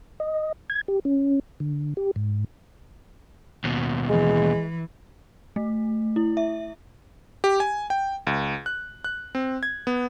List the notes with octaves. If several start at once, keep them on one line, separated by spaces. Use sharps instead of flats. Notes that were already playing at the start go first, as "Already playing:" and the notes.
D#5
G#6
G4
C#4
D3
G4
G#2
D#2 B2
E3 G#3
A3
E4
E5
G4
G#5
G5
C#2
F#6
F#6
C4
G#6
B3